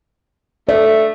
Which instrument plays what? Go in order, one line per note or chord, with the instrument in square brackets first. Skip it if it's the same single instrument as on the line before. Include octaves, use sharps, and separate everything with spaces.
[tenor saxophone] A3 [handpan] D5